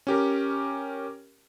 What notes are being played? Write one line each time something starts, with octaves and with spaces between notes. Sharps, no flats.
C#4 G4 A#4